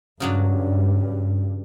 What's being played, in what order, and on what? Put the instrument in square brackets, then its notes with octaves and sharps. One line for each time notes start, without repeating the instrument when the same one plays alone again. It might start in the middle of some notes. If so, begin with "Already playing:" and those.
[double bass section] G2 [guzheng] C#3 F#3 D4